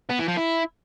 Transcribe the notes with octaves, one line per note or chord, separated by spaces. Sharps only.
B3
E3
F3
E4